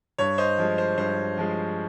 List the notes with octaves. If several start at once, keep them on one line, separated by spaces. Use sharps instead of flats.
G2 C#5
C5 D#5
F3 G#3
C5
G2 C5
F3 G#3